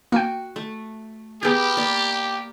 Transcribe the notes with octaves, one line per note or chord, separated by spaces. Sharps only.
A#3 F#4 G5
A3
B3 G4 G#4 A#4 G6
A#3 D5